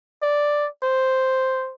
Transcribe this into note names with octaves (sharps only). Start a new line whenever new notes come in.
D5
C5